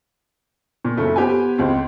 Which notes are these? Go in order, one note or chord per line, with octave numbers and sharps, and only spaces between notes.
A#2
F#1 C#3 A3
B3 G4 C5 G5 G#5
C#2 C#3 C4